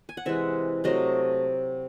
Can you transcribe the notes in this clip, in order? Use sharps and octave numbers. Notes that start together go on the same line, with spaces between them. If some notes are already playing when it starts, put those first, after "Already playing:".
G#5
F#5
C3 E3 G#3 E5
C3 F#3 A3 D#5